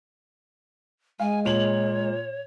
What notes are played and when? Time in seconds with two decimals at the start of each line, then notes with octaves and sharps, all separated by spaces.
1.20 G#3 F5 G#5
1.45 A#2 C#5 F7 F#7